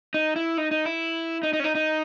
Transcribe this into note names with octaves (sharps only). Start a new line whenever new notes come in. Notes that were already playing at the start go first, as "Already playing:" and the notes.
D#4
E4
D#4
D#4
E4
D#4
D#4
C#4
D#4
D#4